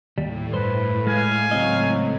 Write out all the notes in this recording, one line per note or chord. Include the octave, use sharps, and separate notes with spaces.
D#2 A2 G3
G2 B4 C5
G#3 F5 G#5
C#2 F#3 C4 D#5